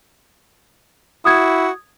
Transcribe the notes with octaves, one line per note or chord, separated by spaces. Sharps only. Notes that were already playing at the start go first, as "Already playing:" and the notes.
E4 F#4 D#6 G#6